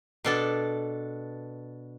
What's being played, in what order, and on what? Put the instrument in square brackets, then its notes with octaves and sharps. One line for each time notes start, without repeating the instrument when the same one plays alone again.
[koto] B2 D4 A4